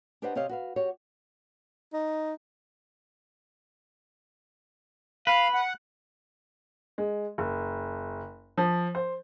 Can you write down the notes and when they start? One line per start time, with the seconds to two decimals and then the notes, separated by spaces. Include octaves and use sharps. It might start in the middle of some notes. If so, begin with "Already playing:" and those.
0.22 D4 G4 B4 C5 D#5 F#5
0.35 C3 C4 G4 C#5 D#5 F5
0.49 F#4 B4 F5
0.76 F#4 G4 C#5
1.93 D#4
5.27 B4 F5
5.54 F#5
6.98 G#3
7.38 F#1
8.58 F3
8.95 C5